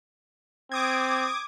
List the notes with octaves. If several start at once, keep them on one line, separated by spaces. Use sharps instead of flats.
C4 D6 D#6 G#6